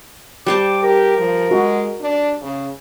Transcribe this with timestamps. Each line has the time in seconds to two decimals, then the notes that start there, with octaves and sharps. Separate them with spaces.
0.46 G3 C5 A5 D6
0.83 G4 A#4
1.18 F3
1.51 G#3 F#4
2.01 D4
2.42 C#3